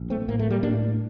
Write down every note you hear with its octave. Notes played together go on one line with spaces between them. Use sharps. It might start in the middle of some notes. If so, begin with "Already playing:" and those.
Already playing: A#1
A3 C4
A2 A#3
A3
G3 A#3
A2 A#3 D4